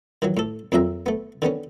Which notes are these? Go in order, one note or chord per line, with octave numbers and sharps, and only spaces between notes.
D#3 E3 F#3
A2 A4
F2 A#2 F#3 C4 E5 A#5
A3 B3
D3 D#3 B3 C#4